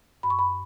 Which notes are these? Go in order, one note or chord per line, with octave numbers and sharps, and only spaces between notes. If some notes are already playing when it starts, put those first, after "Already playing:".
F#2 B5
C#6
B5